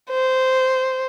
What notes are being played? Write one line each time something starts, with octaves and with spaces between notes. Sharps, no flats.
C5